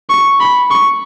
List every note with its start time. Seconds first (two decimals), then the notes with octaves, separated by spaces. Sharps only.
0.10 C#6
0.40 B5
0.71 C#6